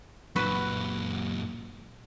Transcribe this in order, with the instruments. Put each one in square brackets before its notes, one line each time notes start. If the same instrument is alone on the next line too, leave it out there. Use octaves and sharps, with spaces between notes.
[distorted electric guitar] F#2 A#2 [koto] F#4 B4